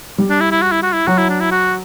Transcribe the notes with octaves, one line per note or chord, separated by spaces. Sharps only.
G3
D4
E4
E4
F#4
E4
F#4
E4
F#3 F#4
E4
D4
E4
F#4